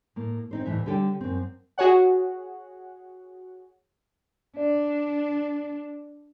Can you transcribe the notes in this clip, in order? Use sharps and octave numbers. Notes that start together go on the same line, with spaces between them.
A2 A#3
C4 D#4 C5
D2 A2 E3 E5
D3 G3 G4 A4 C#5 G5
F#2 C4
F#4 G#4 C#5 F#5
D4 D5